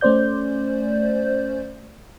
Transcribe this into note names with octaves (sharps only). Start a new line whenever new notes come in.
A3 C#4 C5 D5 G6